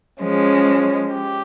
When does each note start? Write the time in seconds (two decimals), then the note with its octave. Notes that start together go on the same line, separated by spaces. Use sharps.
0.22 F3 G#3 C#4
1.14 G4